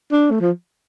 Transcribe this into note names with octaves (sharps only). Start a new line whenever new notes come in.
D4
A3
F3